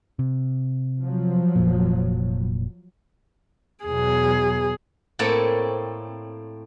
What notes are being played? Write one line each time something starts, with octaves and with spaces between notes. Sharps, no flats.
C3
F3 F#3
F1 A#2
E2 B2 F#3 G#4
A2 A#3 C4 A4 C#5